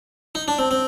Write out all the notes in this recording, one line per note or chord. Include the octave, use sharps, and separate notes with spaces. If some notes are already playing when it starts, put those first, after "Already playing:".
D#4
D4
C4
C4